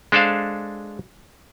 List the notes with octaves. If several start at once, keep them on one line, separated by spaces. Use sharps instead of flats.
G#3 D4 A4 C5 F5